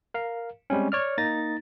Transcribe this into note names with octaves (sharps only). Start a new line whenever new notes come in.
A#4 F5
G3 G#3 C4 C#4
C#5 D5 F6
A#3 D#4 A6 A#6